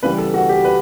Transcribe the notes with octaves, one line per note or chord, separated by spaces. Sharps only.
C#3 E3 G3 B3 B4
A4
F#4
G4
B4